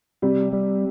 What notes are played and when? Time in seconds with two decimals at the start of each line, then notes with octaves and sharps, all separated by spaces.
0.22 C3 G3
0.53 G3